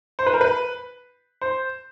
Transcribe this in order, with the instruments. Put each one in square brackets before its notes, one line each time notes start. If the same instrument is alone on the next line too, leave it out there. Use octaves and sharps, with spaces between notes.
[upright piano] C5
B4
A#4
B4
C5